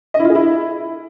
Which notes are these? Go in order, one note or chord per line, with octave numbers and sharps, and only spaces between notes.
D#5
E4
F4
G#4
E4